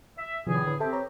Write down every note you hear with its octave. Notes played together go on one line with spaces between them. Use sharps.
E5
E2 A2 C3 D#3 F3 G#4
D3 B4
C4 G4 A4 E5 A5
B4 C#5 A#5